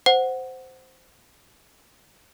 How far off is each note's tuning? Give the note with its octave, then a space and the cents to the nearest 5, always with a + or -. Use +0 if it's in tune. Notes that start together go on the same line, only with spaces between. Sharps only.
C5 -10 F#5 +0